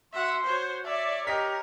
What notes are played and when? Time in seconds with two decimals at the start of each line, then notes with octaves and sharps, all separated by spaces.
0.14 F#4 E5 F#5 C6
0.44 F#4 C5 C#5
0.85 C#5 D5 E5
1.27 G4 A#4 D#5 B6